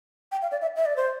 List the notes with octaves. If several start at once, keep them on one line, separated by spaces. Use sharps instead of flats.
G5
F5
D5
E5
E5
D5
C5